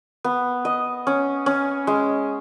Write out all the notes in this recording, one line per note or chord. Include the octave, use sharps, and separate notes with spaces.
B3
D#5
C#4
C#4
G#3